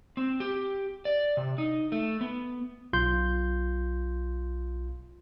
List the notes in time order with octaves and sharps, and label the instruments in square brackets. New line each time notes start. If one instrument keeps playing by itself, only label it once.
[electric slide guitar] C4
G4
D5
C3
D#4
A3
B3
[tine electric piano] B1 F4 C6 G6